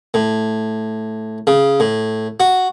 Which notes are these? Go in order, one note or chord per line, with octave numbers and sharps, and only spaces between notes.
A2
C#3
A2
F#4